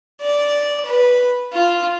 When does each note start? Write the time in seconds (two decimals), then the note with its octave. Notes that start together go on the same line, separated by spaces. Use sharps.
0.21 D5
0.86 B4
1.52 F4